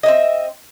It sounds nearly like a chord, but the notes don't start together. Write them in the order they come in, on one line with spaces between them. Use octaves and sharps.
D#5 E5 C4